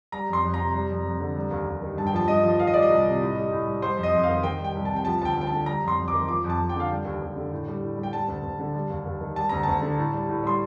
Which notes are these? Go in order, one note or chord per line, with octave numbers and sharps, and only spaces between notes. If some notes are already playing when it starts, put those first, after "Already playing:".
G3 A#5
F2 C6
F2
A#5
C3
G3
F2
F2
D3
G3
D#2
D#2
D#3
G2 A5
G5
F3 A5
G2 D#5
F3
D#3 F5
D#5
G3 D5
D#5
C2
C3
A2
G3
A2
G3
G3 C5
F2
D#5
F2
F5
D#3
D#3 G5
G3
G5
C2
C3 A5
G5
F3 A5
D2 G5 A5
D2
G5
D3 A5
G3 A#5
F2
C6
F2
D6
D#3
F3 D6
F2
A5
F2
G5
D3 F5
G3 G5
D#2
D#2
D3
A2
G3
A2
G3
G5
G3 A5
D2
D2
D3
G3
D#2
D#2
D#3
G3 A5
D2 A#5
D2 A5
D3
A2
G3
A2
G3 C6